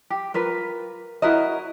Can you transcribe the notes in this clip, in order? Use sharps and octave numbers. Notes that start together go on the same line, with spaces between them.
G4
F4 A#4 B4
E4 F#4 A#4 D#5